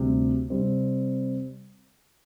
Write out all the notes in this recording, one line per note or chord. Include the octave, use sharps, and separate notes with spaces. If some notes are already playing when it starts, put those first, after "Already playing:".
Already playing: D2 C3 G3
C3 G3 C4